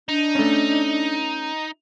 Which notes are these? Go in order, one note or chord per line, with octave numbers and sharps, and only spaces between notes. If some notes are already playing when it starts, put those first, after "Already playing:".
D4 D#4
A3 C#4